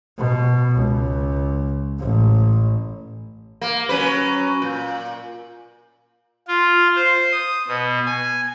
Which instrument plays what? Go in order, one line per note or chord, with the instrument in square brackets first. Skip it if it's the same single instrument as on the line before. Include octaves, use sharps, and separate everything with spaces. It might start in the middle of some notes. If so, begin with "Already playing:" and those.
[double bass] B2
C#2
A1
[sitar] A#3
F#3 C#4 B4
A#2
[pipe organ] F4
C5
D#6
B2
G#5